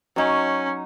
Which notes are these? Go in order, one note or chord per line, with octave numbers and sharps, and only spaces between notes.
F#3 C#4 D#4